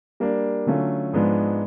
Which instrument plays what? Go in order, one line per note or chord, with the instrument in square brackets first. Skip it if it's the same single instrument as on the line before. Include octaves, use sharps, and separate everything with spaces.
[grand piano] G3 A#3 D4
D3 F#3 A3 C#4 F4
G#2 F3 G#3 B3 D4